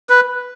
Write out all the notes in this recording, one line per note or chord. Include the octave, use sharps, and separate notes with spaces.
B4